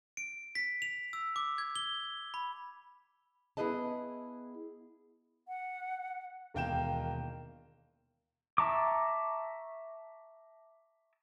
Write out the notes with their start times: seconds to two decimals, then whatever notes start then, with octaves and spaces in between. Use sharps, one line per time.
0.17 D7
0.55 B6
0.82 F7
1.13 E6
1.36 D6
1.58 G#6
1.76 G7
2.34 B5
3.57 B3 E4 G#4 B4 D#5 A5
5.48 F#5
6.54 E1 D#2 A#3 G5 G6 E7
8.58 E5 A5 A#5 C#6 D6